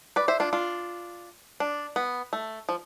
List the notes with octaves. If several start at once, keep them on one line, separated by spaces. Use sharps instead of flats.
B4 D5
C5 E5
D4 F4
D4 F4
D4
B3
A3
F3